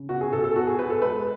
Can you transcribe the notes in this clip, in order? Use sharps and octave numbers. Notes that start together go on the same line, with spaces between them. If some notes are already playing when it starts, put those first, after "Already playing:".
Already playing: C#3
B2 F#4
G#4
B2 A4
A4
B3 F#4
G#4
B3 B4
A4
G#3 B4